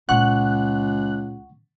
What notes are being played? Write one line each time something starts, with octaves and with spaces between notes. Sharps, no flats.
C#2 A#2 A#3 F#5 C#6 F#6